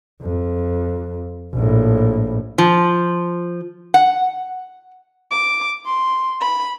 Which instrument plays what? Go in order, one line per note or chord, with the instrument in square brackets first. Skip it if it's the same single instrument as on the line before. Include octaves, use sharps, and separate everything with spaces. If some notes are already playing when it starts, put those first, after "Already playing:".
[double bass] F2
A#1 A2
[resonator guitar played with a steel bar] F3
F#5
[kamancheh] D6
C6
B5